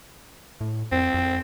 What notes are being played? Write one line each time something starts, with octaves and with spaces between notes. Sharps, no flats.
A2
F2 C4
F2